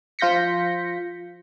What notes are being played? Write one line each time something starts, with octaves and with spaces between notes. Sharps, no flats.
F3 F4 G6 A#6 B6 C#7